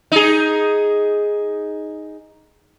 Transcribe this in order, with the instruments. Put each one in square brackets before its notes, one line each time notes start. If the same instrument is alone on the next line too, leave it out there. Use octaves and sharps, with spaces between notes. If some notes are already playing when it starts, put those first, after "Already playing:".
[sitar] D#4 G#4